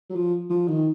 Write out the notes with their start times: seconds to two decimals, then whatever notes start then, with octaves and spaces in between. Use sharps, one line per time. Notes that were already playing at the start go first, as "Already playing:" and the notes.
0.10 F#3
0.16 F3
0.50 F3
0.68 D#3